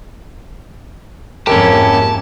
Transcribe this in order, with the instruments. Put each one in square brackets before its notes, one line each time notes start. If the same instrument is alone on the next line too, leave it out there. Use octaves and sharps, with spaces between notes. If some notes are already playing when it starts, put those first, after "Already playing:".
[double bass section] F2 G#2 A#3 [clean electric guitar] C#4 E4 G4 [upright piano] A#4 [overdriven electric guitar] A5